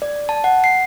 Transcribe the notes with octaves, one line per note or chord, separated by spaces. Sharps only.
D5
A5
F#5
C7